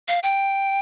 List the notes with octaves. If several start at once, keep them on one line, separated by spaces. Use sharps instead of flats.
F5
G5